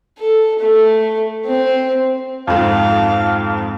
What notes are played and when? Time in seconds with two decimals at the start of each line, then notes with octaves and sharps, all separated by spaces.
0.19 A4
0.60 A3
1.46 C4
2.47 F2 G#2 C4 F5